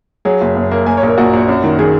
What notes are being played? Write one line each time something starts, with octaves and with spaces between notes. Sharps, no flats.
F#3 G#4
F#1
F#1
A#3
A#3 G#5
C#5
A#1 A#4
A#1 F#4
A#1
F#2
D#3
D#3 G#4